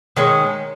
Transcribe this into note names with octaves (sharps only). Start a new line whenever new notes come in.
D#3 G#3 C#4